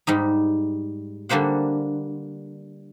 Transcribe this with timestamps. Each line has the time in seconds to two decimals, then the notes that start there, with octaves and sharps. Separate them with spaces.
0.07 G#2 G3 D#4
1.29 D3 G3 A#3 C5 F#5